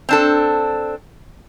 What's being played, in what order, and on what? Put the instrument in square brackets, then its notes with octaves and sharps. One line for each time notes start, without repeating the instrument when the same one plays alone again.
[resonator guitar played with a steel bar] C4 D4 A4